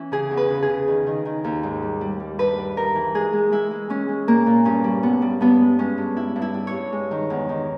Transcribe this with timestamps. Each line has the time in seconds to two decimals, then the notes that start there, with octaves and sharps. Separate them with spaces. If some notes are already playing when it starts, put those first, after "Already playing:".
Already playing: E3 C#4
0.12 C#3 G#4
0.31 E2
0.37 B4
0.50 C#3
0.63 G#4
0.69 C#3
0.88 D#3
1.07 D#3
1.25 D#3
1.44 D#2
1.63 G#2
1.82 G3
2.01 G3
2.20 G3
2.39 G2 B4
2.58 G3
2.77 G2 A#4
2.95 E3
3.14 G#3 G#4
3.33 G#3
3.52 G#3 E4
3.71 G#3
3.89 G#3 C#4
4.09 G#3
4.27 A#2 A#3
4.46 A#2
4.65 G2 C#4
4.84 G3
5.03 G2 B3
5.22 G3
5.41 G2 B3
5.60 G#3
5.79 G#3 C#4
5.98 G2
6.16 G3 E4
6.36 G2
6.42 E4
6.54 G3
6.67 C#5
6.73 G2
6.92 G#3
7.11 D#3
7.30 E2
7.49 D#3